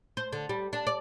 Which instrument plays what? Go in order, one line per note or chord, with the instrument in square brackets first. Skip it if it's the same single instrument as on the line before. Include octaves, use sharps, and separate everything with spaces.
[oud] C5
D3
G3
D4
D5